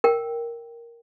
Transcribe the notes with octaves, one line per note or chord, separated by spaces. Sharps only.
A#4 G5